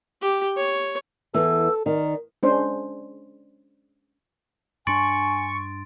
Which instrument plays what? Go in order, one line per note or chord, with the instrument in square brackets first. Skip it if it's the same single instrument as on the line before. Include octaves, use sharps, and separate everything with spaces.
[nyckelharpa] G4
C#5
[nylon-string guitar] E2 E3 [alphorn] A4 [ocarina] E6
[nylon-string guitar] D#3 [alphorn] A#4 [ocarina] D5
[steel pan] G#3 C#4 D4 C5
[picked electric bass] G2 D4 [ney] G#5 [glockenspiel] C6 A6 D7 [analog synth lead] C#6